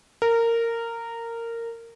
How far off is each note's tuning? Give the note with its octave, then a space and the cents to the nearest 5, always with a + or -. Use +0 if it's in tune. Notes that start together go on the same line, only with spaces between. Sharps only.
A#4 -15